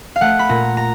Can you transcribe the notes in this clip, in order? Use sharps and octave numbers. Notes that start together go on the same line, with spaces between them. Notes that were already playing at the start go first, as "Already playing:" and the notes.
F5
A3 F#5
B5
A#2 A#5
A#5